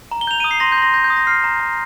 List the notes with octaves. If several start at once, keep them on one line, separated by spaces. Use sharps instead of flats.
A#5
G7
G6 F7
D#6 D#7
C7
C6 A#6
G6
C6 A#6
G6 A#6
G6
D#6
A#6
F6 C7
A#5
A#5